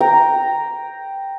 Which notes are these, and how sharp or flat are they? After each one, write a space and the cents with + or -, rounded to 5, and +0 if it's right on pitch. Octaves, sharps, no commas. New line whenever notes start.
G5 +0 A#5 +0